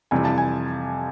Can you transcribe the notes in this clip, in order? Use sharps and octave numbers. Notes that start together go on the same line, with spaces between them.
F2 C3 E3 G3 G#5
A5
G#5